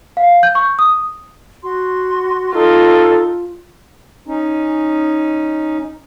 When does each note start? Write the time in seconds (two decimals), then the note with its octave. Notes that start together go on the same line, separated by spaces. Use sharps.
0.17 F5
0.43 G6
0.55 C#6
0.79 D#6
1.63 F#4 C6
2.54 D#4 F4 A4
4.27 C#4 D#4